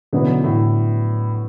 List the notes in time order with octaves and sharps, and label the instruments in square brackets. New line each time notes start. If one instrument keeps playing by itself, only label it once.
[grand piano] B2 E3 [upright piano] D3 F#3 B3 E4
[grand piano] A2